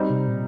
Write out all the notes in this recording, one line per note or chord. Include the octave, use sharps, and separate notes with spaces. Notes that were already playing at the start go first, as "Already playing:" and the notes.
Already playing: G3 C4 D#4
C3
A#2